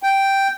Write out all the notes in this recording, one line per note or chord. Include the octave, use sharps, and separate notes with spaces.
G5